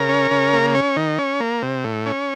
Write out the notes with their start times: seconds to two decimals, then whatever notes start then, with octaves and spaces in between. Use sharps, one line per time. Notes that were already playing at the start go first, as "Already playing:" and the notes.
Already playing: C#3 A#4
0.09 C#4
0.31 C#3
0.53 A#3
0.75 C#4
0.97 D#3
1.19 C#4
1.40 A#3
1.62 C3
1.84 A2
2.06 C#4